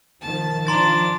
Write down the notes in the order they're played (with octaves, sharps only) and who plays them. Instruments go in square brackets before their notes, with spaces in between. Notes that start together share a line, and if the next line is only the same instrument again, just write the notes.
[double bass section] D#3 F3 [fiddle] A5
[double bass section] F3 [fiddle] D4 D6 [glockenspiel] A#5 C6 A6